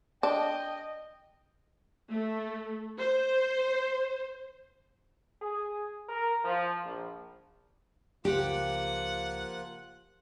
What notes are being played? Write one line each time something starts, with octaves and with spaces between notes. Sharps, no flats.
D4 D#5 G5
A3
C5
G#4
A#4
F3
A#1
C#2 F3 A#3 F4 G4 F#5